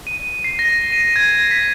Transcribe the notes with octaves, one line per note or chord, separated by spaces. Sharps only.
D#7
C7
A#6
D#7
G#6
C7
B6